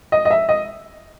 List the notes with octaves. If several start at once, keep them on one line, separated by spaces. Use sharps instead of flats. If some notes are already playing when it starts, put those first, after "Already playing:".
D#5
D#5
E5
D#5